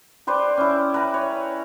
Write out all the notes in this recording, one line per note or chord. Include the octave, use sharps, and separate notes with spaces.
G4 B4 C5 D5
C#4 E4
B4 A#5
C#5